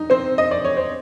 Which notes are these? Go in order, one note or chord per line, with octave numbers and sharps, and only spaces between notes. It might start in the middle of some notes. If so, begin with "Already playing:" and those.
Already playing: D#4
C4 C5
D#5
D5
C#5
C5